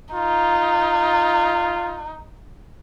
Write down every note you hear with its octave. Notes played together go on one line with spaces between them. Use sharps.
D#4 F4